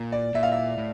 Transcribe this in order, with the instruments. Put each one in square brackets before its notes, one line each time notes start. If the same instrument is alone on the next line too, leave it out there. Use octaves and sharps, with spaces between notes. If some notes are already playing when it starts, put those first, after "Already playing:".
Already playing: [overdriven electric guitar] A#2
[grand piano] D5
[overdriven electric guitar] A#2 [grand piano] E5
[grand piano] F5
E5
[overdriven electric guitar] A2